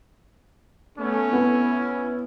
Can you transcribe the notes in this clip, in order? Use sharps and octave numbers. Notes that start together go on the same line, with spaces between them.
A3 B3 C#4
B3 E4